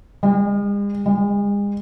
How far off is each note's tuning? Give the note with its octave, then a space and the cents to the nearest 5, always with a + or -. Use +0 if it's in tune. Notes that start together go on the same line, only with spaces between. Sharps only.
G#3 -45
G#3 -40